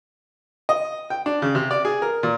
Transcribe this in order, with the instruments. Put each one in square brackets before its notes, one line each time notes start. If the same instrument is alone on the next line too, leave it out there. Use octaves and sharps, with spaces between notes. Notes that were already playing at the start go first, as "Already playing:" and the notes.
[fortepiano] D#5
G5
D4
C#3
C3
D5
G#4
A#4
A#2